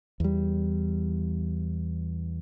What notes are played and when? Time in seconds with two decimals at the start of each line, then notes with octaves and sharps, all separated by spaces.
0.20 E2 G3